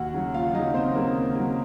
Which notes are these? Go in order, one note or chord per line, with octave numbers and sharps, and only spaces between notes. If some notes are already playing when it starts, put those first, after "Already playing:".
Already playing: D#2 F#4 F#5
C#3 F#3
D#2 F4 F5
C#3 F#3 D#4 D#5
D#2 C4 C5
C#3 F#3 A#3 A#4
D#2
C#3 F#3